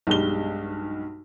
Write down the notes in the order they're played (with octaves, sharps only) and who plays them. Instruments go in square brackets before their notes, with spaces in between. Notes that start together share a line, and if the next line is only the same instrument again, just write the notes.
[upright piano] B1 G2 G#3 G7